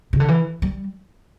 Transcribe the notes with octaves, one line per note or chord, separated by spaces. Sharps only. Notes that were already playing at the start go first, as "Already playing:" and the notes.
C#3
D3
E3
G3